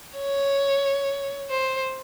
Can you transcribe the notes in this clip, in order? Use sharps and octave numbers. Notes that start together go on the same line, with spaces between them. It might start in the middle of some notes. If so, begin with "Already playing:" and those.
C#5
C5